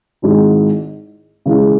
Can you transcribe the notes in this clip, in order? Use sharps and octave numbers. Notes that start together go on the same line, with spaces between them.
G#1 G#2 G#3 E4
C#3 E3 G#3 E4